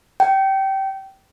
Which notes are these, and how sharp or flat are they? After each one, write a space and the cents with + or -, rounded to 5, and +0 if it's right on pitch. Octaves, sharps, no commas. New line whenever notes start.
G5 -20